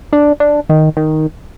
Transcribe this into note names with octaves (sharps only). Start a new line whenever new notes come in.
D4
D4
D#3
D#3